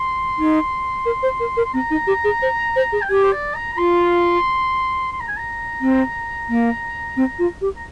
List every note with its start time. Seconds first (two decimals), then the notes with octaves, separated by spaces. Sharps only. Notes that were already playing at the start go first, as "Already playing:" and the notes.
Already playing: C6
0.39 D#4
1.06 A#4
1.23 C5
1.40 A#4
1.57 A#4
1.65 C6
1.74 C4 A#5
1.91 D#4
2.07 G4
2.24 G#4
2.42 C5
2.76 C5
2.92 G#4
3.02 G5
3.09 G4 G#5
3.23 C5
3.32 D5
3.55 A#5
3.73 A#5
3.77 F4 C6
5.12 C6
5.20 A#5
5.28 G#5
5.37 A#5
5.81 C4
6.49 A#3
7.17 C4
7.39 F4
7.61 G4
7.76 A#5